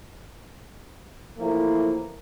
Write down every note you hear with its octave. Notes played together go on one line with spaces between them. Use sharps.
A2 E3 F3 A#3 E4